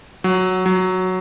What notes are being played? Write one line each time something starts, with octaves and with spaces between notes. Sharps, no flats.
F#3
F#3